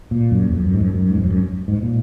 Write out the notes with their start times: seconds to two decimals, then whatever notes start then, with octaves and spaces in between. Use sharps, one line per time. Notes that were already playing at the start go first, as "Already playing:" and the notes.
0.11 A#2
0.31 F#2
0.50 F2
0.66 F#2
0.74 G#2
0.80 F#2
0.95 F#2
1.09 G#2
1.16 F#2
1.23 F2
1.30 F#2
1.68 G#2
1.82 A#2